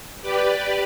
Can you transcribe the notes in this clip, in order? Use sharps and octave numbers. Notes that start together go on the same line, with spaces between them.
G4 B4 D5